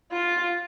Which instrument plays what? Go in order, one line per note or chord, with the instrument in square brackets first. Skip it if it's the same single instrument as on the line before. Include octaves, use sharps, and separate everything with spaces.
[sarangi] F4